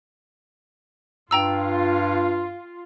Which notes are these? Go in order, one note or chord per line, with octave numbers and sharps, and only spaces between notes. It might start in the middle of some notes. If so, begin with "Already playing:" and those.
G2 F4 G5 A#5 E6